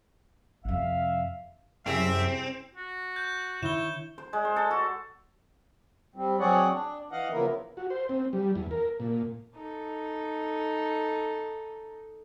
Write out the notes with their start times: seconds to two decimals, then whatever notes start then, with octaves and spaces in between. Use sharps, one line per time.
0.65 F2 C3 E5 F5
1.86 C2 F#2 C4 G#4 E5
2.75 F#4
3.16 G6
3.63 D3 D#3 E4 C#5 E7 G7
4.18 C5
4.33 G#3
4.45 C5
4.56 A4
4.71 F#4
6.16 G3 C4
6.40 F#3 C4 G#4 C#5 D5 F#5
6.73 D4
7.12 E3 D#5 F5 F#5
7.32 C#3 F3 A#3 B3 E4 A#4
7.77 F#4
7.90 C5
8.09 C4
8.33 G3
8.55 E2
8.71 A#4
9.00 A#2
9.56 D#4 A4